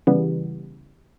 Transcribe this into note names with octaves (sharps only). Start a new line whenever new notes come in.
C#3 E3 G3 B3